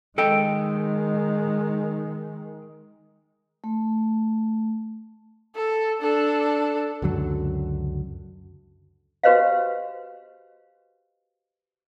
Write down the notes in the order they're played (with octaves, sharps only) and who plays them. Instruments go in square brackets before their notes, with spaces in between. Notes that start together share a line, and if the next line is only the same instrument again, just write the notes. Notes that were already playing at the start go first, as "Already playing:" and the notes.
[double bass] D#3 G#3 [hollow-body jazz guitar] A4 D#5 G5
[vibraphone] A3
[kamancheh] A4
D4 A4
[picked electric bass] C#2 F#2 D3 F#3
[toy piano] F#4 G4 B4 C5 D#5 F5